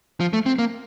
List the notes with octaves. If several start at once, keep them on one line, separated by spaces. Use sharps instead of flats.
F3
A3
C4
A#3